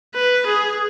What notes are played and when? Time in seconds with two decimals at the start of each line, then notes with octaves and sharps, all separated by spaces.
0.14 B4
0.46 G#4